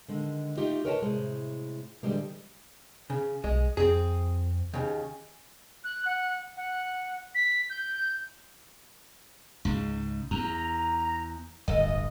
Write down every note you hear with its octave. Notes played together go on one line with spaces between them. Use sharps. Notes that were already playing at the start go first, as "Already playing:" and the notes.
D3 D#3 G#3
A3 D#4 F4 G4 D#5
A#4 B4 C#5 D#5 G5 A5
A2 C3 G#3
D3 E3 G3 G#3 A#3
C#3
B1 G#3
F2 C4 G#4
D#2 C#3
F#6
F#5
F#5
B6
G6
C#2 G#2
E2 A#5
D1 G1 D#5